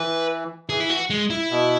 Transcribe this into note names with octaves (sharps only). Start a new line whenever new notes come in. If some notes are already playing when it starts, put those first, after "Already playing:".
Already playing: E3 B4
E3 G#4
E4
F#4
G#3
E4
B2